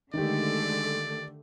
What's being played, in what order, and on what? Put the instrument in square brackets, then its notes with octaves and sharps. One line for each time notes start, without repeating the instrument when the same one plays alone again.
[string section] D3 A3 [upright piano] D#3 G4 [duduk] G#3 [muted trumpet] D5